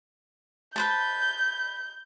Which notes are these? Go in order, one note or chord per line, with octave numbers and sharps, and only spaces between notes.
B4 C5 A5 G6